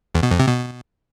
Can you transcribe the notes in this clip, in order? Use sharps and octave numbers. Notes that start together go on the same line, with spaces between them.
E2
B2
F2
C3
B2